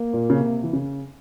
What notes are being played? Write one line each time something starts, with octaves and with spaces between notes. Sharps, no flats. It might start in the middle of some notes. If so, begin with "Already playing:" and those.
Already playing: A#3
A#2
C#3
C3
E3
C#3